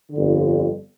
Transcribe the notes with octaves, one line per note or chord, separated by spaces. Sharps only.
G1 F2 D3